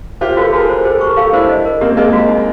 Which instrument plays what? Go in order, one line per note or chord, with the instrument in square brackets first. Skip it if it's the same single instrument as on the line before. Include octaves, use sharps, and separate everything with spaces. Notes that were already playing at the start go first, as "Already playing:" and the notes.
[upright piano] F4 G4 [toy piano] C5
[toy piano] F#4 [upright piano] A4 B4
[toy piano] F#4 [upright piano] G#4 A#4
[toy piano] C5
[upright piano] G4 A4 [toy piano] C5
[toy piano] C#6
[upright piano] A#4
[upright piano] G4 A4 [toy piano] F5
[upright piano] D4 E4 [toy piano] C5
[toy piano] D#5
A#4
[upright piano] A#3 C4 [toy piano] G4
[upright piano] G#3 A#3 [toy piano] D#5
[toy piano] F#4
D#4